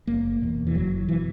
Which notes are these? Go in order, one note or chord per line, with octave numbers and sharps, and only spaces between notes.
F#1 A#3
E2 B2
E3
F#1 F#3
B2 E3